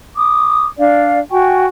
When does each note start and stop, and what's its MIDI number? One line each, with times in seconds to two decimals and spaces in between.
0.15 0.65 86
0.15 0.65 87
0.78 1.19 62
0.78 1.19 74
0.78 1.19 77
1.30 1.64 66
1.30 1.64 79
1.30 1.64 80
1.30 1.64 85